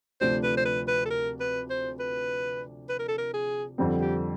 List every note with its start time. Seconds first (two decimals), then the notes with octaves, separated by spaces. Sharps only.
0.21 D2 C3 F3 A3 D4 C5
0.43 B4
0.57 C5
0.65 B4
0.88 B4
1.05 A4
1.10 A#4
1.40 B4
1.70 C5
2.00 B4
2.89 B4
2.99 A#4
3.09 A4
3.18 A#4
3.34 G#4
3.78 F2 D3 G3 C4
4.01 G4